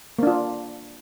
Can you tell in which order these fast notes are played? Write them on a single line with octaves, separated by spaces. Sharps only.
A#3 D4 F4